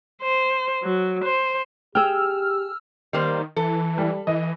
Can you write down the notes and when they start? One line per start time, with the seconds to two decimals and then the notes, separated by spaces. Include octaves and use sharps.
0.22 C5
0.83 F#3
1.24 C5
1.95 G4 G#4 G5 E6 F6
3.13 D#3 G3 A#3 C5
3.56 E3 A4
3.98 G3
4.27 E3 D#5